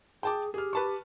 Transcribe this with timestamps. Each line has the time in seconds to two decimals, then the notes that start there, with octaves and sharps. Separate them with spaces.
0.23 G#4 G5 A5 D6
0.54 G4 G#4 F6
0.73 B4 A5 C#6